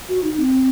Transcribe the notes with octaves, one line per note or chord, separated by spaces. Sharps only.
F#4
D#4
C4